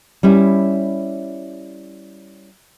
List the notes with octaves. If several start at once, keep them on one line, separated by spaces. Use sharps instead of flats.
G3 C#4 E4